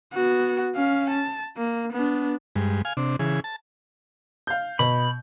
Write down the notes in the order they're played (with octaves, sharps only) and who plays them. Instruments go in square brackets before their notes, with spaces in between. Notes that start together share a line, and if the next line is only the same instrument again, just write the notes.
[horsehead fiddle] B3 F#4
C#4 F5
A5
A#3
B3 D4
[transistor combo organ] G2 G#3
F5 G#5
C3 D4
C#3 E3 G#4
A5
[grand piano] F5 G6
[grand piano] B2 [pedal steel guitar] B5